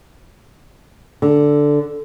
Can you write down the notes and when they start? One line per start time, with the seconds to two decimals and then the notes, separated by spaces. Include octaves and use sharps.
1.22 D3